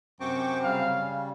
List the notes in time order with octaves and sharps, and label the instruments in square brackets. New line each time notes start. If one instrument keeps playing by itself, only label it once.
[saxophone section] F#2 C3 C4 [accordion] G5 C#6 D6
[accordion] C#3 G3 [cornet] F5